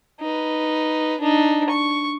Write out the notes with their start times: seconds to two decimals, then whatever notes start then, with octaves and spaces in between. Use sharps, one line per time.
0.21 D#4 B4
1.20 D4 D#4
1.70 C#6